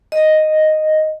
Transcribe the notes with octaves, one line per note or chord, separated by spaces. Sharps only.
D#5